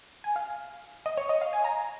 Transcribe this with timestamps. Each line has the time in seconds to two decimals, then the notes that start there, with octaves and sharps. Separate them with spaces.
0.24 G#5
0.36 F5
1.06 D#5
1.17 C#5
1.29 D#5
1.41 F5
1.53 G#5
1.64 A#5